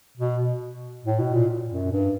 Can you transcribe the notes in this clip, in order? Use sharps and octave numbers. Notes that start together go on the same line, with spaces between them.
B2
A2
B2
A#2
F#2
G2